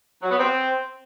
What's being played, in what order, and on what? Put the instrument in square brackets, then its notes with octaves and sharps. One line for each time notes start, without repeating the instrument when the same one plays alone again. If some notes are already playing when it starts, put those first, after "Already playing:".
[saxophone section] F#3
B3
C4